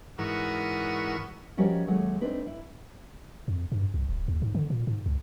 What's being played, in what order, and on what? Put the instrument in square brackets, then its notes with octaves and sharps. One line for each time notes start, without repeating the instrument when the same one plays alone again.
[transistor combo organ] G#2 E3 A#4 [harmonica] B3 C#4 F#4
[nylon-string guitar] F3 G3 C#4 F#4 A#4 D#5
D#2 F#3 G#3 A3 F#5
A3 C4 D4 D#4 B4
E4
[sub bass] F2
G2
C2
D1
D#2
G#2
D3
A#2
G#2
C#2